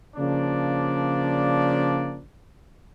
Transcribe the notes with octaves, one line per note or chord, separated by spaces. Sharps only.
C#3 F3 A#3 D4 D5